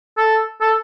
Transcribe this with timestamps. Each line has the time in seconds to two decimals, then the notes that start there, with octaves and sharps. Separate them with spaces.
0.17 A4
0.61 A4